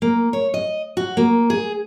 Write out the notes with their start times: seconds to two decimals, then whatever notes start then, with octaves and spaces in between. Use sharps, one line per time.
0.02 A#3
0.33 C#5
0.54 D#5
0.97 F#4
1.17 A#3
1.50 G#4